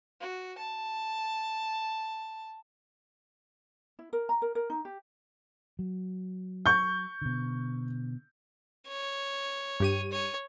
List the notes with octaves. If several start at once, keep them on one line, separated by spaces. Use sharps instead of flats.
F#4
A5
E4
A#4
A#5
A#4
A#4
D#4
G4
F#3
C#6 G6
B2 D3
C#5
G2 G4 D#7
C#5